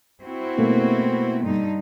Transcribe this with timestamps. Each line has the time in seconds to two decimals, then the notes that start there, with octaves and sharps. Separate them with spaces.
0.22 C4 E4 F#4
0.58 B2 A3 A#3
1.44 G2 D3 D#4